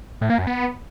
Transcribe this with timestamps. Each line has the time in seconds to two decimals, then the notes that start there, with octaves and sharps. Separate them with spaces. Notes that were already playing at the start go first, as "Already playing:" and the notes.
0.21 A2
0.30 A#3
0.38 F#2
0.47 B3